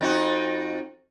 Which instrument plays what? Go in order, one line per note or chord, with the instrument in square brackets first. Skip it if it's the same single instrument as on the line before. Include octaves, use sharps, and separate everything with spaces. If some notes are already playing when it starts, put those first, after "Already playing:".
[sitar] F2 D#4 F#4